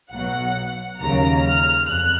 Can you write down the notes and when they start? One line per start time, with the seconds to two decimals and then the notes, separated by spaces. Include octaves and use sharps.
0.12 B1 B2 F#3 F#5
1.00 D#2 C#3 F#3 A#5
1.45 F6
1.88 F2 F#6